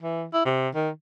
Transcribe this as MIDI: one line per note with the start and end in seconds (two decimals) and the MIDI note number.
0.02 0.25 52
0.33 0.45 64
0.45 0.69 48
0.75 0.90 51